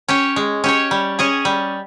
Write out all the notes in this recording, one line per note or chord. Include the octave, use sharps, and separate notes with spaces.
C#4 G4 C#5
G#3
C#4 G4 C#5
G3
C#4 G#4 D#5
G3